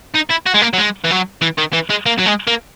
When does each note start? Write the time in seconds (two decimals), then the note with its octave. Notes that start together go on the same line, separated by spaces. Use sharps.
0.15 D#4
0.30 E4
0.47 F#4
0.55 G#3
0.62 A#3
0.74 F#3
0.78 G#3
1.04 E3
1.11 F#3
1.42 E3
1.58 D#3
1.73 E3
1.90 G#3
2.06 A#3
2.19 F#3
2.26 G#3
2.47 A#3